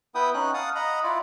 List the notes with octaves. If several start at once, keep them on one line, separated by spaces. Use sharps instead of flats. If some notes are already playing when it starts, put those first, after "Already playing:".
B3 E4 B4 G5 D#6
C#4 D#4 F#6
F5 F#5 A5 D#6
D#5 F#5 A#5 B5
E4 F4 D5